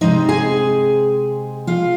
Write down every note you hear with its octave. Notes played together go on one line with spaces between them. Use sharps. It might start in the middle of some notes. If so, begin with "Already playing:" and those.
C3 F3 G#3 C4 D#4 D#5
G#4 G#5
F4 F5